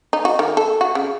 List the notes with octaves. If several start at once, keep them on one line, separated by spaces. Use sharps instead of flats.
D#4
F#4
D#3
A4
F#4
C#3